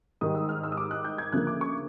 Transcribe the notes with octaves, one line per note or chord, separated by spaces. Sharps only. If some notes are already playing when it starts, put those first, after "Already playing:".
G#2 D#3 G3 D#6
E6
F6
E6
D#6
D6
F#6
G6
G#6
D2 C#3 F3 A#3 F#6
D6
C#6